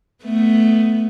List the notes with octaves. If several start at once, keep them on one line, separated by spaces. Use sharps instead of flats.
A3 B3